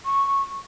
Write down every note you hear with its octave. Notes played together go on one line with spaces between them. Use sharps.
C#6